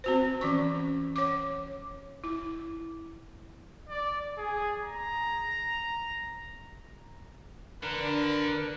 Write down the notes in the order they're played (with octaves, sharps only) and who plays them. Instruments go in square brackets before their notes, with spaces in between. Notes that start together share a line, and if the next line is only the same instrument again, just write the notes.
[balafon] C4 F#4 C5
E3 C#4 C#6
C#5 D6
E4
[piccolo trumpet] D5
G#4
A#5
[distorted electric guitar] D3 [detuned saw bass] D4 [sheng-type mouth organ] A#4 [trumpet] B4